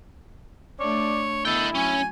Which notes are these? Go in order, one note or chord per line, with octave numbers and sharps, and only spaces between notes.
A3 D4 C#5 D5
B3 E4 A4 D#5 G5
F#3 C#4 G#5